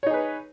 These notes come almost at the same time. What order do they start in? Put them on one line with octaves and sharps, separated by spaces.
C#5 D#4 G#4 B4